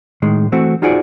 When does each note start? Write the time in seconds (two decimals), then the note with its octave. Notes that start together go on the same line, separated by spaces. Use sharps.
0.22 A2 D#3 G#3
0.52 E3 A3 C4 F#4
0.82 D#4 F4 F#4 G#4 C5 D5